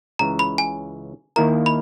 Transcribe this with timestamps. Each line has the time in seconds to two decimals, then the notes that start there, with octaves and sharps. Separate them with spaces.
0.19 C#2 C#3 E3 A#5
0.39 B5
0.58 G#5
1.36 D#2 D#3 A#3 E4 A#4 A#5
1.66 B5